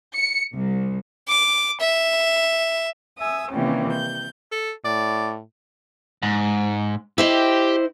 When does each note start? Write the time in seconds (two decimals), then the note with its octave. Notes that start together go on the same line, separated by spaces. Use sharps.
0.14 C#7
0.55 C2
1.28 D6
1.80 E5
3.18 E5 G#5 D#6 E6
3.51 C3 D#3 E3 G3 A#3 C#4
3.92 G6
4.52 A4
4.85 A2 D5
6.22 G#2
7.18 E4 G4 C5 D#5